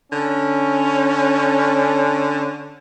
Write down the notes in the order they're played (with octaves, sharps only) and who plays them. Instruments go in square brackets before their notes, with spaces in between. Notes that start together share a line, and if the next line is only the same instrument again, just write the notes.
[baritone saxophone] D3 [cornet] C#4